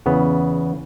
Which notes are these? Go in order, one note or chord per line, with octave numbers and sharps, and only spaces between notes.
E2 C#3 B3